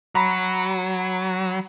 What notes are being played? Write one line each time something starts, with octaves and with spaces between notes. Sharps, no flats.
F#3 A#5 B5